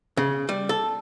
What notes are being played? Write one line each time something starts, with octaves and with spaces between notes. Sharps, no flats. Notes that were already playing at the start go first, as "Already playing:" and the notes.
C#3
G3
A4